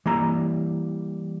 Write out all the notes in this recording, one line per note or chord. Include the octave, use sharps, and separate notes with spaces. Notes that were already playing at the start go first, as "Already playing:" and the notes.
E3 G3 A#3 A#5